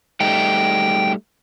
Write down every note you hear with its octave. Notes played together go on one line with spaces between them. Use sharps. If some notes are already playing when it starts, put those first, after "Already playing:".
G3 A3 D#4 G5